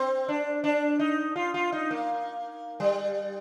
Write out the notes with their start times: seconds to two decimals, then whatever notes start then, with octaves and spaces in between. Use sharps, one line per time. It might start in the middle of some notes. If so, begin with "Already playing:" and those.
Already playing: C4
0.28 D4
0.64 D4
0.99 D#4
1.36 F4
1.54 F4
1.72 D#4
1.91 A#3
2.80 G3